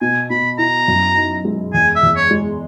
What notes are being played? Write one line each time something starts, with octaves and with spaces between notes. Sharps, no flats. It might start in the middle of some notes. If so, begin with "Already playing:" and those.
B2 G#5
B2 B5
E4 A#5
F#2
D#4
G#3
E2 G#5
E5
E2
C#5
G#3